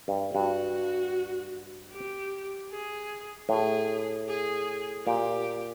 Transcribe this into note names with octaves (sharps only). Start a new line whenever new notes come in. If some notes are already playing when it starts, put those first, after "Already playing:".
G2
G2 F#4
G4
G#4
A2 G#4
G#4
A#2 G4